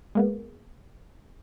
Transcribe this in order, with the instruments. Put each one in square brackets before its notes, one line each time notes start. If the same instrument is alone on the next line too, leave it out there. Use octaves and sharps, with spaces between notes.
[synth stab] G#3 A#3 B3